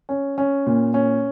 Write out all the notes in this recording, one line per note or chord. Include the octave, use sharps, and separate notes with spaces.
C#4
C#4
A#2
C#4